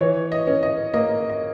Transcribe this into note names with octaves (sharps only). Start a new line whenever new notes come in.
E3 C#5
D#5
C#4
D#5
A#3 D#5
D#5